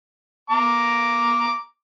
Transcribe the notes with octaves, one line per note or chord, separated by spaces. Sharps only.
A#5 D6